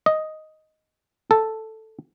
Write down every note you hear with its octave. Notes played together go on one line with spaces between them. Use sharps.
D#5
A4